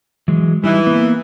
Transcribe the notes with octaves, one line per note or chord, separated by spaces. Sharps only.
E3 F#3 G#3
E3 G3 D#4
A#3 B3